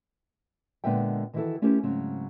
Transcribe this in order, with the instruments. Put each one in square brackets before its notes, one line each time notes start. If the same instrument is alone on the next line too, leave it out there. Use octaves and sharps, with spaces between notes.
[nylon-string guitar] A#2 D3 G#3 B3 E5 G5
D#3 E3 G3 E4 F#4 A4
A3 C#4 E4 G4 A#4 C5
G#2 C#3 F#3 C4